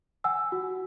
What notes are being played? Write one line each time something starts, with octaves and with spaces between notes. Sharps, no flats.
F#5 G#5 E6
F#4